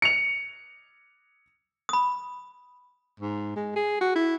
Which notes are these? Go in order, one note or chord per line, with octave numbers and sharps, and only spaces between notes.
C#7 F7
B5 D#6
G#2
G#3
G#4
F#4
E4